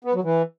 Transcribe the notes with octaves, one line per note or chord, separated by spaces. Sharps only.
B3
F#3
E3